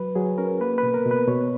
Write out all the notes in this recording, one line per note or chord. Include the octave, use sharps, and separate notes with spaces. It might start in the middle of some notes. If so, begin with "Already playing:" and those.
Already playing: F#3 B4
F#3 G#4
C#4 A#4
A#3 B4
B4
B2
A#4
B2
B4
B2 C#5